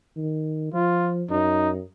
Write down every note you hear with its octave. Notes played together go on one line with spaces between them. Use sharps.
D#3
F3 F4
F#2 D#4